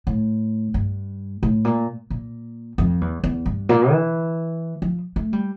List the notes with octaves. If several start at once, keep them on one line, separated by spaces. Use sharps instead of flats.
A2
G2
A2
A#2
A#2
F2
E2
E2
G2
A#2
E3
F3
A3
G3